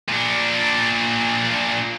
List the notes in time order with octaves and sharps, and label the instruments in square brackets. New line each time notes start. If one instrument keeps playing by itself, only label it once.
[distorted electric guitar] A#2 D4